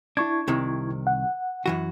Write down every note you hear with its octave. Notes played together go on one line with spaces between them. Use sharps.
D4 E4 C#6 G#6
C2 C3 D#3
F#5
F#2 E3 F#4